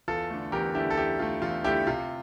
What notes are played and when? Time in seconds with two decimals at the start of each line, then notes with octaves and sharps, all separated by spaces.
0.08 E2 F4 A4
0.30 D3 A3
0.52 E2 G4 A#4
0.75 D3 A3 E4 G4
0.90 A4
0.97 E2 E4 G4
1.19 D3 A3 F4
1.42 E2 F4
1.64 D3 A3 E4 G4
1.87 C3 F4